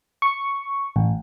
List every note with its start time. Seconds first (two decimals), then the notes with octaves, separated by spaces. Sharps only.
0.22 C#6
0.96 A1